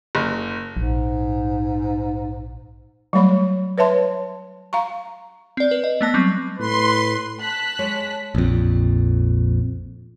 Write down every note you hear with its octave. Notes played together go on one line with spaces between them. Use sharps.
F#1
A#1 G#2
F#3 G3 A3 C#5 B5
B4 C#5 E5 A5 C6
F5 A#5 C#6
C4 D5
B4
D#5
A3 B3 A5 A#6
F#3 G3 C4
A2 B4 C6
A5 F#6 B6
G#3 C#5
A#1 F2